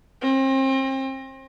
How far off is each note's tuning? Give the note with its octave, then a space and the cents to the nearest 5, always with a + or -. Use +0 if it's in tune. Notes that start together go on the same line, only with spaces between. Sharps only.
C4 +35